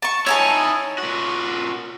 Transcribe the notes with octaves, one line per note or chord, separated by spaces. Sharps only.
A5 C#6
D#4 E4 C#5 G#5 A5
A#2 F#4